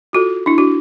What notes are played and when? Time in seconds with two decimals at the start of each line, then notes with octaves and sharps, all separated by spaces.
0.13 F4 F#4 A4
0.46 D4 E4
0.58 D4 F#4